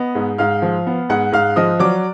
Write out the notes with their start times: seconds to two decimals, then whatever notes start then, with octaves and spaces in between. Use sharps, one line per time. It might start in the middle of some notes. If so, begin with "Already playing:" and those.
Already playing: B3 D#5
0.15 G#2
0.38 G#2 F5 F6
0.62 F3
0.87 B3
1.09 G#2 F#5 F#6
1.32 G#2 F5 F6
1.56 F3 D#5 D#6
1.79 F#3 D5 D6